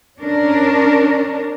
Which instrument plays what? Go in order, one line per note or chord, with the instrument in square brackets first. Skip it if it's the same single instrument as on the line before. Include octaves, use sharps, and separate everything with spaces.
[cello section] C#4 D4 A#4